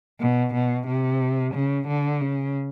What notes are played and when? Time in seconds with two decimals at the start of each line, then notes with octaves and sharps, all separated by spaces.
0.20 B2
0.54 B2
0.87 C3
1.54 C#3
1.87 D3
2.21 C#3